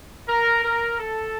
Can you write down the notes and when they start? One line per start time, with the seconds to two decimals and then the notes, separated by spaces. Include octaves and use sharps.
0.29 A#4
0.64 A#4
1.00 A4